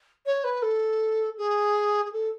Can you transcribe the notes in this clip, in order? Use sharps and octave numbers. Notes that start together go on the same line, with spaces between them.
C#5
B4
A4
G#4
G#4
A4